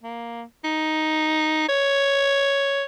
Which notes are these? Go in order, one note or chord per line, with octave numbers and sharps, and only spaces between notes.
A#3
D#4
C#5